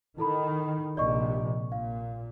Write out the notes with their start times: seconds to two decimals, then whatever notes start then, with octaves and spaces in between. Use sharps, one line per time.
0.18 D#3 E4 A4 B5
0.97 A#1 C3 D5 D#5 C#6
1.72 A#2 F5